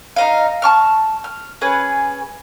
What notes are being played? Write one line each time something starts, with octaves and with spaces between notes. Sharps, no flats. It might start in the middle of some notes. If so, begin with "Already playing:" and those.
D#4 D#5 F5
A5 C#6 F6
F6
C#4 G#4 B4